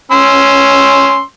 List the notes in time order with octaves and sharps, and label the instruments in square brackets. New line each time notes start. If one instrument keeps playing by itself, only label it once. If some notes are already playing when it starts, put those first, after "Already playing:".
[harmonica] C#4 C6 E6